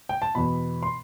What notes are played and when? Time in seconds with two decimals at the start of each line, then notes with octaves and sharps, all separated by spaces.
0.09 G5
0.22 A5
0.35 E2 B2 B5
0.83 C6